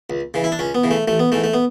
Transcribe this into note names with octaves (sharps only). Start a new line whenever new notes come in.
C#2
C#3 E3
E4
D4
C#2 C#4
B3
C#3 E3
A3
A1 A3
B3
G#2 E3 A3
A3
B3